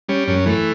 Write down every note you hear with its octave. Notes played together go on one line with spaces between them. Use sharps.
G3 C#4
F#2 C#4
E3 A3